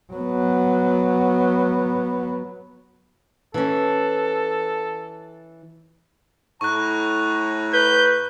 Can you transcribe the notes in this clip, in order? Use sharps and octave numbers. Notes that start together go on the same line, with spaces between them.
F#3 B3
E3 C#4 A4
A2 A#5 C#6 F#6
B4 G6